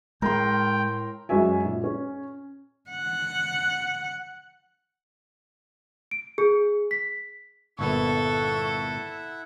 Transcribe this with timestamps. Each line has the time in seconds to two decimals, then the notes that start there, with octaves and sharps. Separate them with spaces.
0.22 A2 G#3 A#4 G5 C6
1.29 F#2 G#3 C#4 F#4 E5 G#5
1.65 A#2
1.84 C#4
2.90 F#5
6.11 D7
6.38 G#4
6.91 B6
7.79 G1 A#2 B3 E4 A4 E5 F#5 C#6